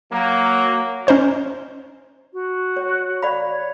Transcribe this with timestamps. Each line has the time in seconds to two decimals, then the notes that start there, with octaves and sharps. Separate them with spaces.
0.11 F#3 A#3
1.07 C#4 D#4 C5 C#5
2.33 F#4
2.76 C#5
3.22 D5 F5 B5
3.51 C#5